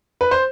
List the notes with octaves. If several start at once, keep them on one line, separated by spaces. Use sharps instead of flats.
B4
C5